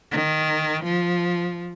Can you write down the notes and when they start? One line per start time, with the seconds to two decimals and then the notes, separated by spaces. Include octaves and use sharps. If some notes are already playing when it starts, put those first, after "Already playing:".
0.12 D#3
0.84 F3